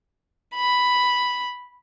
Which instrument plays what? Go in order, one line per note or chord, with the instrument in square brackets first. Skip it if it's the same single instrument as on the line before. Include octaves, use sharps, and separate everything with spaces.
[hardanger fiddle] B5